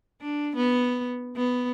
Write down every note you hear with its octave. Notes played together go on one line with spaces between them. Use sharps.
D4
B3
B3